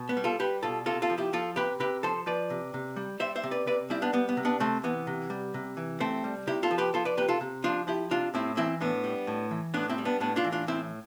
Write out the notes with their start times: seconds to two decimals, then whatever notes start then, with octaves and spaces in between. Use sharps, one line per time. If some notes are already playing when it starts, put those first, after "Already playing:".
Already playing: B2
0.09 B3
0.17 G3
0.24 F4 A4
0.39 G3 G4 B4
0.63 B2 F4 A4
0.86 C3 F4 A4
1.02 F4 A4
1.10 F3
1.18 E4 G4
1.33 F3 F4 A4
1.56 C3 G4 B4
1.80 C3 G4 B4
2.03 F3 A4 C5
2.26 F3 B4 D5
2.50 C3
2.74 C3
2.96 G3
3.20 G3 C5 E5
3.36 C5 E5
3.44 C3
3.51 B4 D5
3.67 C3 B4 D5
3.90 G3 C4 E4
4.02 B3 D4
4.13 G3 B3
4.29 B3
4.37 C3
4.45 B3 D4
4.60 C3 A3 C4
4.84 E3 B3
5.07 C3
5.30 G3
5.54 C3
5.77 E3
6.00 C3 A3 C4
6.24 G3
6.47 C3 E4 G4
6.63 F4 A4
6.71 F3
6.78 G4 B4
6.94 F3 F4 A4
7.05 B4 D5
7.17 C3 G4 B4
7.29 F4 A4
7.41 C3
7.64 F3 D4 F4
7.87 F3 E4 G4
8.11 C3 D4 F4
8.34 A2 C4 E4
8.57 E3 C4 E4
8.81 A2 B3 D4
9.04 G3
9.27 A2
9.51 E3
9.74 A2 B3 D4
9.90 C4 E4
9.98 G3
10.05 B3 D4
10.20 A2 B3 D4
10.36 D4 F4
10.44 E3
10.52 D4 F4
10.67 A2 C4 E4